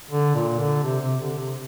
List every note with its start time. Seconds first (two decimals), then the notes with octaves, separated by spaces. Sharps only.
0.11 D3
0.35 A#2
0.59 D3
0.83 C3
1.01 C3
1.20 D3
1.38 C3